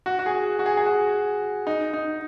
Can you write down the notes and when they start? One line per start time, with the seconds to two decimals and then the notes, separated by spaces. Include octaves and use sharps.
0.06 F#4
0.19 F#4
0.26 G#4
0.59 F#4
0.66 G#4
0.77 G#4
0.86 F#4
1.67 D#4
1.93 D#4